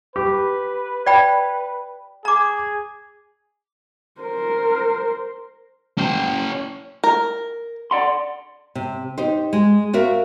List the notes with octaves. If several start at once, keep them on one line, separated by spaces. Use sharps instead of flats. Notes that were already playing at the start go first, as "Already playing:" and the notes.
G4 B4
D5 G5 B5
G#4 A#5 D6
A#4 C5
C#4 G5
A#4
D5 F#5 C6
C3
D#4 G4 C5
G#3
F#4 A#4 E5 F5